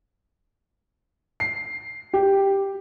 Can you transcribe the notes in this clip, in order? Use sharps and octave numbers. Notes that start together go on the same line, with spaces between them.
C7
G4